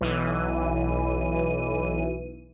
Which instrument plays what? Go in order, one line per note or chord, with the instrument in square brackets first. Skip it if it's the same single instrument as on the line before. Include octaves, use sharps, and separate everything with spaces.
[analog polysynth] B1 E3 D#7